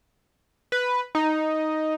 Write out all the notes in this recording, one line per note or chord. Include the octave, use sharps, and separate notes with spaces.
B4
D#4